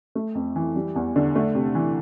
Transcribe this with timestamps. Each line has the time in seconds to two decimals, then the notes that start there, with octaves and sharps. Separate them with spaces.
0.15 A3
0.35 F2
0.56 E3
0.76 G3
0.96 E2
1.16 D3
1.35 A3
1.55 C3
1.75 E3